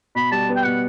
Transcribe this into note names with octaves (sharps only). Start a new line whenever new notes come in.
B2 B5
G3 A5
B3
G5
B2 F#5